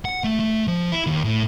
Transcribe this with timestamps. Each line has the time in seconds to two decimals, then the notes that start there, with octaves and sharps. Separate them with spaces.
0.05 F#5
0.24 A3
0.39 A3
0.67 F3
0.92 E4
1.07 D#2
1.24 A2